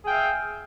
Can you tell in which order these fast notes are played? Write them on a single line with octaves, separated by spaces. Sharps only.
G#4 G5 F5 E5